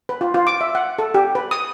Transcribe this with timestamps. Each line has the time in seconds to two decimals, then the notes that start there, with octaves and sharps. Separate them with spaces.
0.09 B4
0.21 F4
0.34 F4
0.47 D6
0.61 E5
0.75 F#5
0.99 A4
1.14 G4
1.35 B4
1.51 D#6